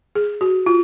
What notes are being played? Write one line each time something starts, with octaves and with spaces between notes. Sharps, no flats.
G#4
F#4
F4